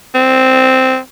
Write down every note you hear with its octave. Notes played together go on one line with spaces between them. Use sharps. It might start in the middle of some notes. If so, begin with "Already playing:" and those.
C4